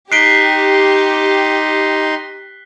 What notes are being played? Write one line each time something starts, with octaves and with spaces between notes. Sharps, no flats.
D#4 G4 C6 F#6 B6 C7 D7 G7